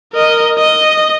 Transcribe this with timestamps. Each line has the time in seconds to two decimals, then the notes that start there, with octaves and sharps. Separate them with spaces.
0.14 A#4 D#5
0.58 D#5